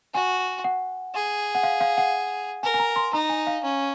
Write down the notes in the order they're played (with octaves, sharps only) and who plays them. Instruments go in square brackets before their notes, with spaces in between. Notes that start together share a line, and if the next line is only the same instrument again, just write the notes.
[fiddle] F#4 [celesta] G#5
[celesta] F#5
[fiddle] G#4
[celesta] F#5
F5
F5
F#5
[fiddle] A#4 [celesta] G#5
[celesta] G#5
A#5
C6
[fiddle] D#4 [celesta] A#5
[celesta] G#5
F5
[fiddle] C#4